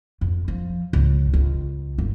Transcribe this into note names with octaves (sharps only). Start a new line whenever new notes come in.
F2
F3
C#2
C#2
G1